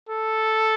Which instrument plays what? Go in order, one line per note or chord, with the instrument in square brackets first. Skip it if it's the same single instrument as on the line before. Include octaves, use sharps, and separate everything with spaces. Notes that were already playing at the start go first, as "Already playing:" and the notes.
[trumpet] A4